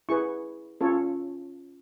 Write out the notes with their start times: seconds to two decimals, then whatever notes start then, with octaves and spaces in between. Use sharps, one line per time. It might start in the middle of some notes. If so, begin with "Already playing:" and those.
0.09 E4 G#4 B4 C#6
0.81 C#4 F4 A4 C#5